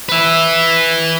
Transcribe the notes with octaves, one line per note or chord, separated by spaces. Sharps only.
B4 E5